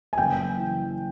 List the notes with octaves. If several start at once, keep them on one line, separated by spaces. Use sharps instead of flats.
G#5
F#1 G5
E3